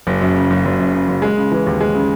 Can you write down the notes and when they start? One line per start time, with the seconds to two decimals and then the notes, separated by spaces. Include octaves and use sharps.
0.07 F#1
0.21 F#2
0.36 C#3
0.50 F#1
0.65 F#1
0.79 F#2
0.93 C#3
1.08 F#1
1.22 G#3
1.37 C#3
1.52 E3
1.66 D#2
1.81 G#3
1.95 C#3